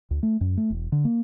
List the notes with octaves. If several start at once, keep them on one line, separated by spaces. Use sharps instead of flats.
D2
A3
F#2
A3
E1
D3
A#3